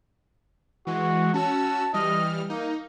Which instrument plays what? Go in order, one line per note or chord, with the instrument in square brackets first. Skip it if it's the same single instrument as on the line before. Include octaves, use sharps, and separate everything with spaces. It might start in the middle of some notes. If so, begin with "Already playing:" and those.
[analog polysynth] E3 G#3 [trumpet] F#4
[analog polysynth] C#4 F#4 E6 [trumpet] A5
[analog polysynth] E3 G3 F6 [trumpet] D#5
[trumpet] A#3 [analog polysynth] D#4